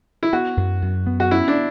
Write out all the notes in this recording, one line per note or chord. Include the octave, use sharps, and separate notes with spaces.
E4
B3 F#4
F#2
F#2
B3
F#4
C#4 E4
D4